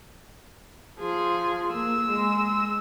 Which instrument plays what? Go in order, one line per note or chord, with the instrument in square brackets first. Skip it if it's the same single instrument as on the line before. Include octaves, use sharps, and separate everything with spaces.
[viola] F3 [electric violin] G#4
[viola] A#3 [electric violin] E6
[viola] G#3